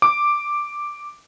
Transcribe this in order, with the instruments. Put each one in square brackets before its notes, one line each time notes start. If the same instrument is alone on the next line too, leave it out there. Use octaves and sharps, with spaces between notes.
[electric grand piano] D6